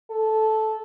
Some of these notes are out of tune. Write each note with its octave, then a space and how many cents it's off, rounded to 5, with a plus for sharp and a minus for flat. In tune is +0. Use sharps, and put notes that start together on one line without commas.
A4 -10